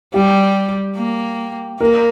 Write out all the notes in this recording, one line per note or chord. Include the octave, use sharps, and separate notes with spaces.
G3 G4
A#3
A#3 A#4